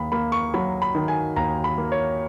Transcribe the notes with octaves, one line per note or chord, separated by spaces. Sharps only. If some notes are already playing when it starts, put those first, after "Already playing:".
Already playing: D#2 B5
A#3 B5
C#6
F#3 B5
B5
D#3
G#5
D#2 A#5
B5
A#3
C#5